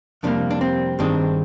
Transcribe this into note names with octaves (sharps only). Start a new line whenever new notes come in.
F2 C3 G3 A#3 D4
D4
C4
G2 D#3 G#3 C4 D4